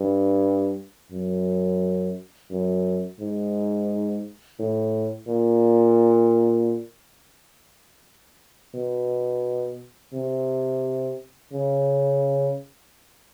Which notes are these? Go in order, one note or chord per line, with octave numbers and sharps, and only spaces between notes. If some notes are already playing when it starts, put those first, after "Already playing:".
Already playing: G2
F#2
F#2
G#2
A2
A#2
B2
C3
C#3